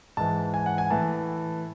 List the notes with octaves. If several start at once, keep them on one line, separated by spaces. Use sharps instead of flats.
G#2 E3 A5
G#5
F#5
G#5
A2 E3 A5